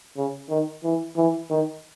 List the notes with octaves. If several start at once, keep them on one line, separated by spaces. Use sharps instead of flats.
C#3
D#3
E3
E3
D#3